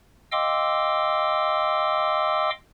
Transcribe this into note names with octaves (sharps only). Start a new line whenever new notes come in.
D#5 F5 G5 C6 D6 E6